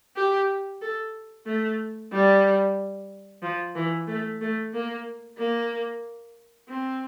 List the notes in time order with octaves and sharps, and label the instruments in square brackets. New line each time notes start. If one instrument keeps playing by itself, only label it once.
[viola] G4
A4
A3
G3
F3
E3
A3
A3
A#3
A#3
C4